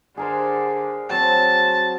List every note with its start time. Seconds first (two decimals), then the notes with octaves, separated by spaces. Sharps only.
0.17 D3 G#4 A#4 C5
1.10 F#3 C4 A5